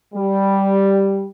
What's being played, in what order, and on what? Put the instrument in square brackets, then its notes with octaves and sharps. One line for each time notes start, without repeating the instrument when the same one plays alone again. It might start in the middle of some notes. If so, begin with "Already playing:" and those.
[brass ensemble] G3